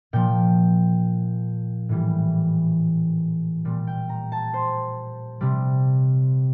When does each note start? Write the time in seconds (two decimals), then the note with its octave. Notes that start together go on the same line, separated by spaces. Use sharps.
0.13 A#2 F3 G5
1.89 A2 E3 G3
3.65 A#2 G3
3.87 G5
4.09 A#5
4.32 A5
4.54 C5
5.41 C3 G3